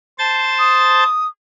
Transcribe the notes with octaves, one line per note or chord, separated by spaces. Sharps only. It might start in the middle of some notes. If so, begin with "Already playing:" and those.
C5 A5 A6
D#6